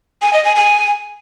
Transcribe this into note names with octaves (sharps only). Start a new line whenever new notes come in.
G#5
D#5
G#5
G#5